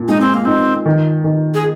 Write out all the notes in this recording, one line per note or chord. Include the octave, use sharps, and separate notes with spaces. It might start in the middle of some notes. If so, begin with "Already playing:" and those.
Already playing: A#2
G#3 D#4
C4
A#3
C4 D#4
D#3
D#3
G#4